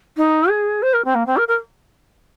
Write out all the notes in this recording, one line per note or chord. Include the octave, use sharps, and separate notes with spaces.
D#4
G#4
C5
A#4
C4
A#3
C4
A#4
A#4